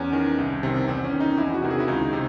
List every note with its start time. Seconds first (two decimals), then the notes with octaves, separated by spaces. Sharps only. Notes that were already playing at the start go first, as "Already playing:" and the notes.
Already playing: E2 C#4
0.13 D#3
0.38 C2
0.63 C3 D#3
0.88 E2 C4
1.04 C#4
1.12 D#3
1.20 D#4
1.37 E2 E4
1.54 F#4
1.62 C3 D#3
1.70 G#4
1.80 E4
1.88 C#2 D#4
2.13 C3